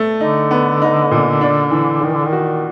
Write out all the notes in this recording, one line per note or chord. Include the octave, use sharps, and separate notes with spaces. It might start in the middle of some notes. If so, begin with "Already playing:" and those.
Already playing: A3
D3 D#4
B3
D#4
A#2
D4
E3
D#3 E3
D3
D#3
F#4